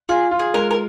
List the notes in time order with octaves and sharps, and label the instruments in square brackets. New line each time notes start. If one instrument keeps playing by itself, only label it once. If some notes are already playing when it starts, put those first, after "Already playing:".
[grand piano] F4 [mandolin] G#4
[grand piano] F4
[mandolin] G#4
[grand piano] G#3 [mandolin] A#4
[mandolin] A#4